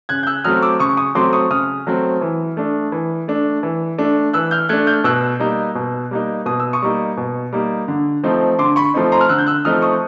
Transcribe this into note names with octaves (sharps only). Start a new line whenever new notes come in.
C#3 F#6 G#6
G6
E6 F#6
F#3 A3 C4 D#6 F6
D6 E6
C#3 C#6 D#6
C#6 D#6
F#3 A3 C4 C6 D6
C#6 D#6
C#3 D#6 F6
F#3 A3 C4
E3
A3 D4
E3
A3 D4
E3
A3 D4
E3 E6 F#6
F6 G6
A3 D4 F#6 G#6
F6 G6
B2 E6 F#6
G3 A#3 D#4
B2
G3 A#3 D#4
B2 D#6
E6
C#6 D#6
G3 A#3 D#4
B2
G3 A#3 D#4
D3
F3 A3 C4 D#4
D3 C6 D6
B5 C#6
F3 A3 C4 D#4
A#5 C6
F6
D3 E6 F#6
G6
E6 F#6
F3 A3 C4 D#4 D#6 F6
C#6 D#6